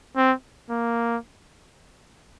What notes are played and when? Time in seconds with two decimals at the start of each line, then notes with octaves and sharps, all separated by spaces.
0.16 C4
0.70 A#3